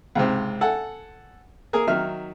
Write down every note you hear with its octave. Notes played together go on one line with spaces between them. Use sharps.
C#2 G#2 C3
A4 F#5 G#5
A#3 G#4 A#4
D#3 F#3 D#4 E5 F6